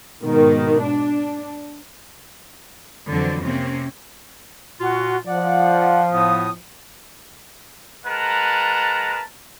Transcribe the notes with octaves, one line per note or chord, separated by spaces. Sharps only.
G#2 B2 D#3
D4
F2 D3 E3 F#3 C4
C3 A#3 C4 C#4
A#2 F4 F#4
F3 D5 F#5
A2 B3 D#6
G#3 A#4 B4 F#5 A5 A#5